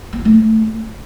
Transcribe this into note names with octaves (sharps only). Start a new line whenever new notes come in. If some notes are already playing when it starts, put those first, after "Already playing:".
B3
F4
A3